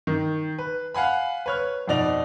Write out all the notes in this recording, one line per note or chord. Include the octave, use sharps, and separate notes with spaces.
D#3
B4
F5 F#5 G#5 B5
B4 C#5 F6
F2 B2 D#4 D5 F7